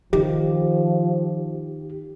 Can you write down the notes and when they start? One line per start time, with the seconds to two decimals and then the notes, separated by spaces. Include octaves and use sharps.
0.13 D#3 F3 G4